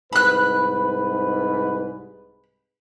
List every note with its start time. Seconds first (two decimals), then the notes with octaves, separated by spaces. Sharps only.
0.13 C2 G#2 B4 B5 F#6